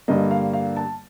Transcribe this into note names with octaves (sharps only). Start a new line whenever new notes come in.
G2 D3 G3 A#3 D#5
F5
F5
A5